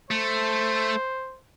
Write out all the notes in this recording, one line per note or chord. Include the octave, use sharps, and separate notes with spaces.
A3 C5